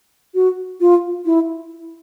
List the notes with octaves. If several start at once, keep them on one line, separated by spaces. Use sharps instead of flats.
F#4
F4
E4